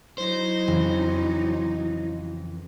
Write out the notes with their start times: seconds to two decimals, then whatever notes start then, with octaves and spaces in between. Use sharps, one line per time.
0.18 F#3 D#4 E4 C5
0.67 F2 C#3 E3